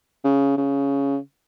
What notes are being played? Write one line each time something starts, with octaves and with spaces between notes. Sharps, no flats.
C#3
C#3